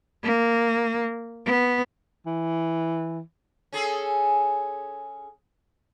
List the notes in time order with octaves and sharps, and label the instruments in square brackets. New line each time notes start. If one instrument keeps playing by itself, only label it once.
[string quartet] A#3
B3
[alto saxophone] E3
[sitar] C#4 G#4 A4